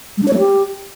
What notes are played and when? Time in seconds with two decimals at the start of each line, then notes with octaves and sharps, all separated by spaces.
0.17 G#3
0.23 D4
0.28 C#5
0.33 A3
0.38 G4